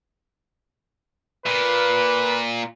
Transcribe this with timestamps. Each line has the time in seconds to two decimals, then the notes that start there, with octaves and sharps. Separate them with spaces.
1.46 A#2 B4